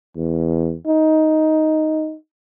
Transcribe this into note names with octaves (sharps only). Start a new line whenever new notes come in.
E2
D#4